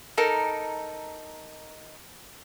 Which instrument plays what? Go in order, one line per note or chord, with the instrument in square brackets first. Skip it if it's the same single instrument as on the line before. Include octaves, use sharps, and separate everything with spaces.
[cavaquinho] D#4 A4 A#4